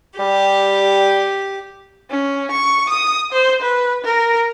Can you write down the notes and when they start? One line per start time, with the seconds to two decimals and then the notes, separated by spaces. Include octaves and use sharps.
0.19 G3 G4
2.10 C#4
2.51 C#6
2.90 D#6
3.33 C5
3.62 B4
4.04 A#4